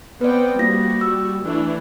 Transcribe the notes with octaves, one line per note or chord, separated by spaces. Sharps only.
B3 C4 B4 D5 G5
G3 A#3 F4 F#4 A#6
E6
E3 A3 D4